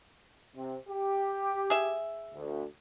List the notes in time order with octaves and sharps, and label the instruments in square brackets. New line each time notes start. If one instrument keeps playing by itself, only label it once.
[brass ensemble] C3 C4
G4
[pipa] G#4 E5
[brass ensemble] D2